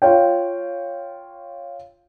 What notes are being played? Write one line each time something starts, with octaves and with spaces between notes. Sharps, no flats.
F4 C#5 G5